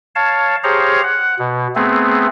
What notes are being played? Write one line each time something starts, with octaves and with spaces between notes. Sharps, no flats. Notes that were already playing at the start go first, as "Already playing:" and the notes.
C#5 F5 A5
G4 G#4 C5 C#5 F5 A#5
F#5
B2
A3 B3 C4 G#4